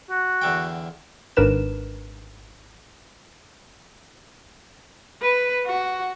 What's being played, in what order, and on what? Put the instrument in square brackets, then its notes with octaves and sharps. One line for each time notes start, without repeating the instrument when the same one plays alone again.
[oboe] F#4
[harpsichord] E2 D3 G5
[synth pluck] G#1 G#2 D4 A#4 B4 E7
[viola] B4
F#4